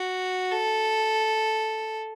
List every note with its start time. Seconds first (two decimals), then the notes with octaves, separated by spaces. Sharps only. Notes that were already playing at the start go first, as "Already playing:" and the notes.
Already playing: F#4
0.52 A4